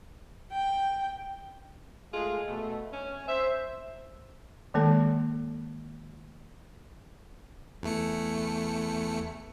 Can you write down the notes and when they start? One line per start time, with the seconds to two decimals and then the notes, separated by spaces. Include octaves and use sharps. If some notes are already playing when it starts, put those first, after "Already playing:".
0.53 G5
2.13 G#3 A3 F4 G#4
2.47 B2 A3
2.93 C#4
3.28 C5 E5
4.74 D#3 G#3 A#3 A4
7.83 E2 A3 C#7